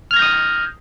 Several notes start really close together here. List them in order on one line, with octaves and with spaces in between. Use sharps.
F6 G#6 A#6 G6 D#6